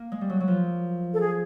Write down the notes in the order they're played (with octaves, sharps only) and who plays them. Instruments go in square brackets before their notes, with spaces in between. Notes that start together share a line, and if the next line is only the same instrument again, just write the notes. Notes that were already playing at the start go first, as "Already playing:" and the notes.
Already playing: [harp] A#3
G#3
G3
F#3
F#3
F3
[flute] A4
G#4